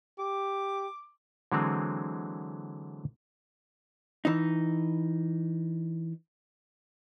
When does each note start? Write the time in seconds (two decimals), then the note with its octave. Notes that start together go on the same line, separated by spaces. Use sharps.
0.19 G4 D6
1.52 D3 E3 F#3 G#3 C4
4.25 E3 D#4